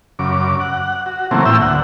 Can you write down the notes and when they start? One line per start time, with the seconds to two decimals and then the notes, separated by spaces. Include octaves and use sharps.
0.19 F#2 C#3 D6
0.60 F#5
1.06 F#4
1.31 C#3 E3 F#3 A3 A#3 C4
1.46 A2 A#3 E4 G5 E6
1.61 D2 F#5